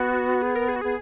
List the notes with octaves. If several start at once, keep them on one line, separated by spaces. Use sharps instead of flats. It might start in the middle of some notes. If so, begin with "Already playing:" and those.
Already playing: B3 F#4
G#4
A#4
G#4
F#4
B3 G#4